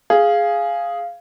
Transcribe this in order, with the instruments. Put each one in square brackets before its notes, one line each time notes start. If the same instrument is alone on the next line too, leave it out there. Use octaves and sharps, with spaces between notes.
[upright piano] G#4 [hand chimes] F5